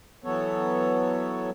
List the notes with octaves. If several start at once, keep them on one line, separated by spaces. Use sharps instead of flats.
E3 F#3 B3 A4 C#5